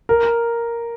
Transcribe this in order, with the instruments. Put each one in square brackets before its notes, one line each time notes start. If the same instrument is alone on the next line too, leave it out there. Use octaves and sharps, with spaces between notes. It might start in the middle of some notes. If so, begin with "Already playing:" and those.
[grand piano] A#4